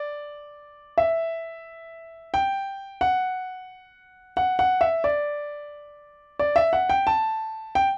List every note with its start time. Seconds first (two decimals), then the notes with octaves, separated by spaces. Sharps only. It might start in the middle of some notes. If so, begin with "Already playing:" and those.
Already playing: D5
0.98 E5
2.34 G5
3.01 F#5
4.37 F#5
4.59 F#5
4.81 E5
5.04 D5
6.39 D5
6.56 E5
6.73 F#5
6.90 G5
7.07 A5
7.75 G5